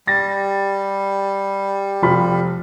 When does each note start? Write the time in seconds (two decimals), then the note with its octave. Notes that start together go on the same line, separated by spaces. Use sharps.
0.07 G3 A6 A#6
2.02 F1 F4 B5